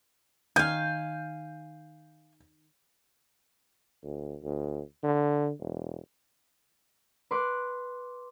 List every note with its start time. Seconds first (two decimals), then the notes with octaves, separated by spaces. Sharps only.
0.56 D#3 F5 G#5 G6
4.03 D2
4.44 D2
5.03 D3
5.60 E1
7.31 B4 C6 D6 F#6